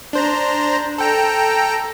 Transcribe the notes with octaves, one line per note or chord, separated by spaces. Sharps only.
D4 C5 A#5
A4 G5 A#5